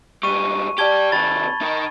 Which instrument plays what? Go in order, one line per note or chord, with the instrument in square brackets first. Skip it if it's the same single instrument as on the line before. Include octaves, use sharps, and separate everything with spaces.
[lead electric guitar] G#2 G3 [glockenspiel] C#6 D#7
[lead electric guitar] G4 D5 [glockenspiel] A5 G#6 G7
[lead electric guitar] C3 D#3 [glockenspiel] B5 A6
[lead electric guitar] D#4 A#4